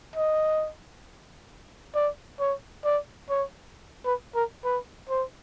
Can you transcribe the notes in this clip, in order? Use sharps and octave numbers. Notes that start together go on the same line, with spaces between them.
D#5
D5
C#5
D5
C#5
B4
A#4
B4
C5